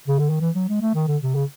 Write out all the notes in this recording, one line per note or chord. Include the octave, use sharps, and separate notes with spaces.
C#3
D3
D#3
E3
F#3
G#3
A3
D#3
D3
C3
C#3